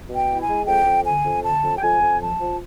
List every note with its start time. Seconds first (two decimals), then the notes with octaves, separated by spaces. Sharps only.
0.09 B2
0.16 G5
0.29 E4
0.42 G#5
0.48 G#3
0.67 F2 G5
0.86 F2
1.05 D3 G#5
1.25 F2
1.44 D3 A5
1.64 F2
1.78 G5
1.82 F2 G#5
2.02 F2
2.21 F3 A5
2.40 F3